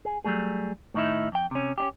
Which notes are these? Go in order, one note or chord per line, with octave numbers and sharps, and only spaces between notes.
G#4
F#3 G3 A3 G#4
A2 D#3 D#4 E4
F2 G5
C3 C#4
C#4 D4 G4